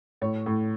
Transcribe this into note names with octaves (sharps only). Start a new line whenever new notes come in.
A2 C#5
A2